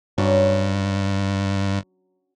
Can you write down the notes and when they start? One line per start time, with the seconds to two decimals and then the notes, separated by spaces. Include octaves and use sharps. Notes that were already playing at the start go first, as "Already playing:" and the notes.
0.18 G2 F#3 C#4 D4